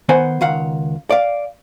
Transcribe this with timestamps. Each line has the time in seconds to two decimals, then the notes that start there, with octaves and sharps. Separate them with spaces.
0.09 D#3 B3 C5 F#5 G#5
0.41 C#2 D#3 F5 F#5
1.10 D5 F5